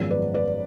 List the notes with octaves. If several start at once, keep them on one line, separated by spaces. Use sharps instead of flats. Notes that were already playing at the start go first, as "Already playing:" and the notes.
Already playing: G#1 F#2 F3 G#3 B3
B4 D5
B4 D5